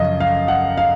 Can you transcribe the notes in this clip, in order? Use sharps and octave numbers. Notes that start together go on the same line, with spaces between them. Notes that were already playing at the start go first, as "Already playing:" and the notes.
Already playing: F#2 C#3 F3 D#5
F5
F#5
F5